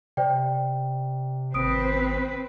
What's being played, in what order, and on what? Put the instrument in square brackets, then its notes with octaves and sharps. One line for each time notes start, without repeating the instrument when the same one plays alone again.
[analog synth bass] C3 [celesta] C5 D5 G5
[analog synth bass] G#1 [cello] C4 B4 [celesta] D#6 D7